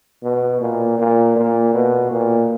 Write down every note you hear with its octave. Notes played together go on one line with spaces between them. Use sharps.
B2
A#2
A#2
A#2
B2
A#2